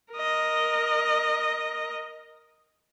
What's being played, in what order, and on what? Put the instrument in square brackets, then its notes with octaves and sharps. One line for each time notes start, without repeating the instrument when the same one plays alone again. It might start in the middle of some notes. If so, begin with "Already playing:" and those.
[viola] A#4 D#5